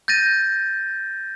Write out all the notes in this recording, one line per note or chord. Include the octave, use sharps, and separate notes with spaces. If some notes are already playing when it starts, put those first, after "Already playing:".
G6 A6 A#6 D#7